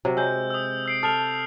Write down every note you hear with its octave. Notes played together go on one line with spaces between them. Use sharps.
C3 F#3
G#3 E6 G6
D#6 E6
E6 C7 D7
A4 D#6 F6 F7